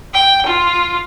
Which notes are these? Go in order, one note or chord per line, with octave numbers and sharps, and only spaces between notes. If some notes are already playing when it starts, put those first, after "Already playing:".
G5
F4